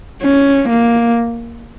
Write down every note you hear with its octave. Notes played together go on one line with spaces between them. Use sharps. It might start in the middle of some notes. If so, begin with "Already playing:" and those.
C#4
A#3